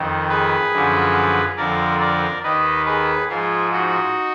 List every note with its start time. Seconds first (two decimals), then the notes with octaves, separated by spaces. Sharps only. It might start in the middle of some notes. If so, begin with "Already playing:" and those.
Already playing: F2 D#3
0.29 G#4 B4
0.72 F#2 D3 F3
1.57 F2 D3 F3 A#4 D5
2.00 A#4 D5
2.43 D#2 D#3 B4 D#5
2.85 G#4 B4
3.28 G#2 F3 F4 G#4
3.72 D#4 F#4